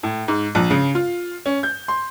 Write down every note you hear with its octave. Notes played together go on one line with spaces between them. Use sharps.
A2
G#2
A#1
C#3
F4
C#4
G6
C6